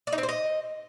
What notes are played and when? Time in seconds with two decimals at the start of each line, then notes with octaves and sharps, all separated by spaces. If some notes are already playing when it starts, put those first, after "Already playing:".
0.07 D5
0.13 D#4
0.18 C4
0.23 C5
0.29 D#5